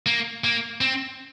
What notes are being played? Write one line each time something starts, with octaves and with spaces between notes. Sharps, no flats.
A#3
A#3
C4